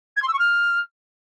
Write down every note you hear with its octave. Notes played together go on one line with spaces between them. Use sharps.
G#6
C6
E6
C#6
F6